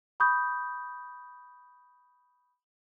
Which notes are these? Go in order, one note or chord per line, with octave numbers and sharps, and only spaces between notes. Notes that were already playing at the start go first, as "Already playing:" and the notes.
B5 C#6 D#6 G6